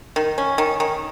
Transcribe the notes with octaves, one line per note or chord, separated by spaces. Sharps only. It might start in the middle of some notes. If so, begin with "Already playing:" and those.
D#3
C#4
D#3
D#3